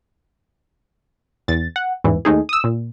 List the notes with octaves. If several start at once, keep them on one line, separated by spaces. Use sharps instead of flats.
E2 A6
F#5
A1 E2 G#2 E3
D#2 A3 D#4 G#4
D#6 E6
A#2